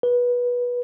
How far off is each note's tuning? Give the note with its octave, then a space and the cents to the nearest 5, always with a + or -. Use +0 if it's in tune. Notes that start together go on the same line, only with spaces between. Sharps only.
B4 -20